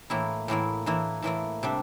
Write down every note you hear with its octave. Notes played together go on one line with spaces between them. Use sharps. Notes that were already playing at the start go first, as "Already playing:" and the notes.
A2 E3 A#3 E4
A2 E3 A#3 E4
A2 E3 A#3 E4
A2 E3 A#3 E4
C3 G3 D4